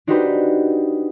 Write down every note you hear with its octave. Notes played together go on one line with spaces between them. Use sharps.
D4 D#4 F#4 G4 B4 C5